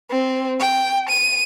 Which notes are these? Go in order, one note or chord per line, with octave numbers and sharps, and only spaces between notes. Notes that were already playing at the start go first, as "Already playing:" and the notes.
C4
G5
D#7